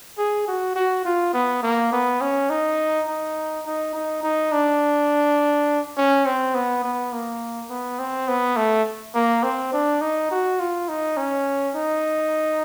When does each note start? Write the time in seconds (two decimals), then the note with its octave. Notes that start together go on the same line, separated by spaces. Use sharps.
0.18 G#4
0.48 F#4
0.76 F#4
1.05 F4
1.34 B3
1.63 A#3
1.92 B3
2.21 C#4
2.50 D#4
3.08 D#4
3.65 D#4
3.94 D#4
4.23 D#4
4.52 D4
5.97 C#4
6.26 C4
6.55 B3
6.84 B3
7.13 A#3
7.70 B3
7.99 C4
8.28 B3
8.57 A3
9.15 A#3
9.43 C4
9.73 D4
10.01 D#4
10.31 F#4
10.60 F4
10.89 D#4
11.17 C#4
11.75 D#4